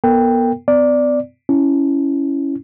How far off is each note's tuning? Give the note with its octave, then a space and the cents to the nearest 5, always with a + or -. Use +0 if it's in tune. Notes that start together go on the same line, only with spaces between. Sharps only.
B3 -30 A#4 -40 G5 +10
B3 +40 D5 +0
C#4 +0 E4 +0